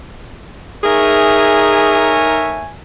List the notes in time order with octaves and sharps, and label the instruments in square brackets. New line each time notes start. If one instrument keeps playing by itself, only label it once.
[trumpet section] A3 C#5 G#5 [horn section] D#4 A#4 E5 [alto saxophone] G#4